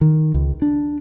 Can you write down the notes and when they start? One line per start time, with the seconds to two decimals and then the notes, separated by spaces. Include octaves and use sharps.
0.01 D#3
0.34 C#2
0.62 D4